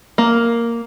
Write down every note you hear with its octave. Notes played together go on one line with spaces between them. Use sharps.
A#3